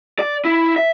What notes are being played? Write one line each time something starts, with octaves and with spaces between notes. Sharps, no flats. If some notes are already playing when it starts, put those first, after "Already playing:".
D5
E4
E5